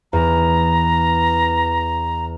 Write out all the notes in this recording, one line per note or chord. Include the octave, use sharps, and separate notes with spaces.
E2 A#5